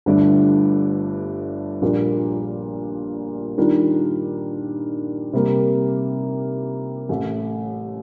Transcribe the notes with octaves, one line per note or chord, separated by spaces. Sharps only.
G1 G2 D3 A3 D4
A#1 A#2 G3 A#3 D4
D#3 G3 D4 F4 A#4
C3 G3 A#3
A1 A2 A3